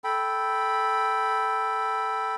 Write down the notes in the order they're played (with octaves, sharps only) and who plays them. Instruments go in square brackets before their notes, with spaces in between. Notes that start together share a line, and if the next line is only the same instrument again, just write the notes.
[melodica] A4 G5 B5